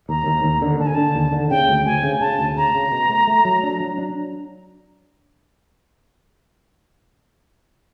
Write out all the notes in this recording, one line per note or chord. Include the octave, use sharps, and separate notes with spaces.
D#2 A#5
D#2
D#2
D3
D3 A5
G#5
D3 A5
D#2
D3
C#3 G5
D2
D2 G#5
C#3
C#3 A5
D2
C#3 A#5
C#3
B2
A3
A3
F#3
D4
F#3
D4